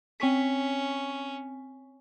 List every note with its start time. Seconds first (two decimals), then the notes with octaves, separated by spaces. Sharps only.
0.20 C4 C#4 C#6 B6